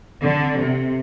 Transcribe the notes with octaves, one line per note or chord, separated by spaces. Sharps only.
D3 A4
C4
C3 A4
C4